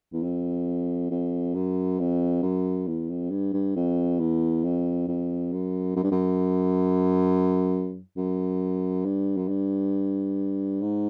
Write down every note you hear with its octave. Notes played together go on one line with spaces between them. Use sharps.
E2
F2
F2
F#2
F2
F#2
E2
F2
G2
G2
F2
E2
F2
F2
F#2
F#2
G2
F#2
F#2
G2
F#2
G2
G#2